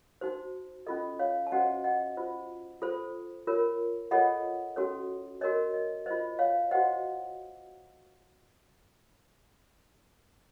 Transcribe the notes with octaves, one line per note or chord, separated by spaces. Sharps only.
D#4 F#4 C5
C#4 F4 A4 D#5
C#5 F5
A5
C#4 F#4 C5 D#5 F#5
D#5 F#5
F4 C5
F4 A4 C5
F4 A#4 C#5
F4 A4 C#5 D#5 F#5
C#4 F#4 A4 C#5
F#4 A#4 C#5 D#5
D#5
F4 C5 D#5
C#5 F5
F#4 C5 D#5 F#5